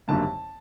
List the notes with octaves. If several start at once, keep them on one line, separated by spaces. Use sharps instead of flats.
G#1 F#2 D3 G3 A#3 A5